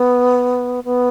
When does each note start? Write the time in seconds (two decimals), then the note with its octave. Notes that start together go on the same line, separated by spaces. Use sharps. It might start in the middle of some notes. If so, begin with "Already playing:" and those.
Already playing: B3
0.84 B3